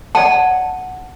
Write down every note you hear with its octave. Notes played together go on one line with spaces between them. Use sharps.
D5 F#5 A5